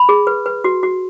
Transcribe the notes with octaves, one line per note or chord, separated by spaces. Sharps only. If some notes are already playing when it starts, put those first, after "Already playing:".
Already playing: B5
G#4
B4
B4
F#4
F#4